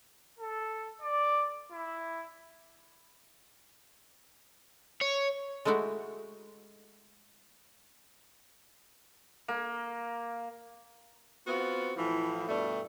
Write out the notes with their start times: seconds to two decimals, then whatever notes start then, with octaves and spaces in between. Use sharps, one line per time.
0.39 A4
1.02 D5
1.72 E4
5.01 C#5
5.65 G#3 A3 D#4 E4 F#4
9.48 A#3
11.47 B3 C4 F4 F#4
11.96 A2 E3 F3
12.49 G2 B2 G3 A3